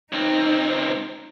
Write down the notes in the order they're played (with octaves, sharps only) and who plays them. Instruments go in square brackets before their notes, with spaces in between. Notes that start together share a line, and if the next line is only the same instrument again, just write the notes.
[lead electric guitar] C#2 C4 [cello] D#4